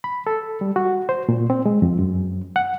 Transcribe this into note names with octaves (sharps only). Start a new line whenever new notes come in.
B5
A4
G3
F#4
C5
A#2
C4
G#3
F2
F#2
F#5